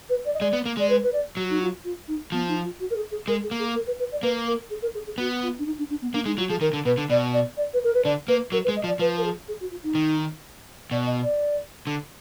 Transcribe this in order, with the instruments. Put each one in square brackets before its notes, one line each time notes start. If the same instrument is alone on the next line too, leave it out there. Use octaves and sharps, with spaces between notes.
[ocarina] B4
D5
D#5
[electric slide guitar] G#3 [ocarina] D5
[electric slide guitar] B3
A#3
[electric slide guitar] G#3 [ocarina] D5
[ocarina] B4
B4
D5
[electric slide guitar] F#3 [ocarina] F#4
[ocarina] D#4
F4
F4
D#4
[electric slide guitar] F3 [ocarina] B3
[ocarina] D#4
F4
F#4
A#4
G#4
G#4
[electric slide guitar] G#3 [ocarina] A#4
[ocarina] G#4
[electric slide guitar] A#3
[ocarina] G#4
A#4
B4
B4
D5
[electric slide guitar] A#3 [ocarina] B4
[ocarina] A#4
G#4
A#4
G#4
G#4
[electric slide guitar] B3 [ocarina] F#4
[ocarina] F4
D4
D#4
D4
D4
B3
[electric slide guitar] A#3 [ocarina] D4
[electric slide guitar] G#3 [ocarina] D#4
[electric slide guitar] F#3 [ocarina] F4
[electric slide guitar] F3 [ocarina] G#4
[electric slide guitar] D#3 [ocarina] A#4
[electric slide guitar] D3
[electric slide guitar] B2 [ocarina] B4
[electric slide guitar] D3
[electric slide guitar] B2 [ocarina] D5
[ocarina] D5
D5
B4
A#4
B4
[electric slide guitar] D3 [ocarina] D5
[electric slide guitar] A#3 [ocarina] B4
[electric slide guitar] F#3 [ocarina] A#4
[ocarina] B4
[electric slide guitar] G#3
[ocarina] D#5
[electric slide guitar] F3
[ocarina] D5
[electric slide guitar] F3 [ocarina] B4
[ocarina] A#4
G#4
G#4
F#4
F4
D#4
[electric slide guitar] D#3
[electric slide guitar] B2 [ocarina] D5
[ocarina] D#5
D5
[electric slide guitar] D3